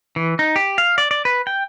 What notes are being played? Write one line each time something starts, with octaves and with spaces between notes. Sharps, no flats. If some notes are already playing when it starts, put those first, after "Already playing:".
E3
D#4
G4
F5
D5
D5
B4
G5